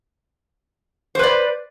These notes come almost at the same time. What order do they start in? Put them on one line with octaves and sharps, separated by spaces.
C5 B4 D5